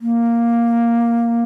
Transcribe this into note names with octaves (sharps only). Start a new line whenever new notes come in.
A#3